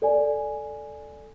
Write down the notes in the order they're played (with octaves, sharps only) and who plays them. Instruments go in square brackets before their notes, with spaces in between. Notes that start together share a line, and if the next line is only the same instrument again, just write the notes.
[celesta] A4 D5 G#5